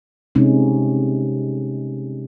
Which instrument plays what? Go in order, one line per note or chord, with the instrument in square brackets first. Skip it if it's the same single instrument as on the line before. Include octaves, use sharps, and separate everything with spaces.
[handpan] C3 G#3 C#4 D#4